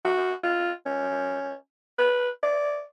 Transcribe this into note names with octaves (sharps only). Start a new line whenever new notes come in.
F#4
F4
C#4
B4
D5